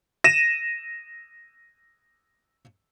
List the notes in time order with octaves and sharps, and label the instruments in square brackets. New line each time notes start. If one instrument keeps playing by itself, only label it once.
[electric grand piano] A#6 D#7 E7